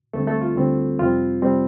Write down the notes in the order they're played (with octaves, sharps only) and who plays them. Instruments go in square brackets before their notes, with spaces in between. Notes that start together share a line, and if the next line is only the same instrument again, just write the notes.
[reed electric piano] D2 D3 G3 A3 C4 A4
A3 A4
F4
D2 D3 G3 C4
F2 C3 G3 C4 F4
C3 G3 C4